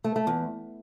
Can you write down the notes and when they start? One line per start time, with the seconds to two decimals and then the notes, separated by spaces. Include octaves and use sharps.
0.04 A3
0.16 A3
0.27 E2